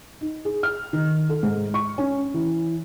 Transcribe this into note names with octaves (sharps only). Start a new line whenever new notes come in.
D#4
G#4
F6
D#3
A4
G#2
C#6
C#4
E3